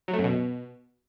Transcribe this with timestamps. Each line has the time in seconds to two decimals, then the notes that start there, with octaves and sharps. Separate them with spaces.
0.08 F#3
0.13 A3
0.19 F#2
0.24 B2